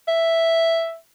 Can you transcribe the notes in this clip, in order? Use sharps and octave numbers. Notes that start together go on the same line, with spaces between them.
E5